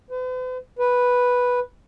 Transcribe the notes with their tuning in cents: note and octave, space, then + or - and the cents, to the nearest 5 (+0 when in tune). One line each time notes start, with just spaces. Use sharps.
B4 +45
B4 -5